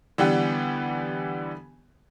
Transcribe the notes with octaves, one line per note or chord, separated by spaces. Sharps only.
D3 E3 G3 B3 G4